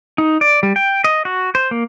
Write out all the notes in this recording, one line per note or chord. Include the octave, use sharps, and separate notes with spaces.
D#4
D5
G3
G5
D#5
F#4
C5
A#3